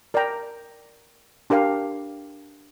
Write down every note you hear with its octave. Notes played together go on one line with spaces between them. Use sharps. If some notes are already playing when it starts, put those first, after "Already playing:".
A#4 D5 G5 A#5
D4 G4 A#4 F5